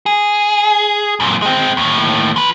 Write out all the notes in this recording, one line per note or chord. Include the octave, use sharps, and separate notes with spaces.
G#4
F#2 A#2
G#3 C4
D#2 A2
F3 B4